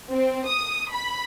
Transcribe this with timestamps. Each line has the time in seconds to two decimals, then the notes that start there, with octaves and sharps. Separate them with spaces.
0.11 C4
0.47 D#6
0.92 B5